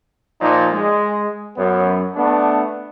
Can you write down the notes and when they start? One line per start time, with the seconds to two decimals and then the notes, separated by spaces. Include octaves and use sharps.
0.40 A#2 F3 D#4
0.73 G#3
1.57 F#2 B3
2.15 A3 B3 D4